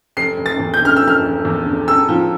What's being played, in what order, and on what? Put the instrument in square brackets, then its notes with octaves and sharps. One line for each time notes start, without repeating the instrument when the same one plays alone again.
[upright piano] F1 C7
F1
A6
E2
G6
D3 F6
E6
F1
F6
F1
E2
D3
E1 E6
F3